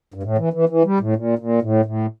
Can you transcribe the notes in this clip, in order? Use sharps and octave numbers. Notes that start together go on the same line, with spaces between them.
G2
A2
E3
E3
E3
G3
A2
A#2
A#2
A2
A2